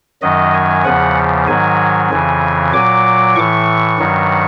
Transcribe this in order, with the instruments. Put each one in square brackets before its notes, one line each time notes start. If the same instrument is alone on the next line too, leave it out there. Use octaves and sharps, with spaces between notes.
[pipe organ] F#2 D#3 F#3 D#5
G#5
E2 C#3 F3 F#5
G#2 D#3 F#3 G#5
F2 C#3 E3
A#2 F#3 D6
A2 E3 C#6
G2 D#3 F#3